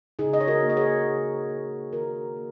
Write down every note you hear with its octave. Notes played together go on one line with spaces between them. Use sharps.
C#3 D#4 G#4
D#5
C#5
F#4 A#4
A#3
D#5
G#4 C#5
C#3
A#3
D#3 F#4 A#4
A#3